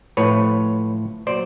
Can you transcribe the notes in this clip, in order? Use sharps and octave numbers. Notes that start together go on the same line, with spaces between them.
A2 F3 A3 B4 C#5
A#2 F#3 C5 D5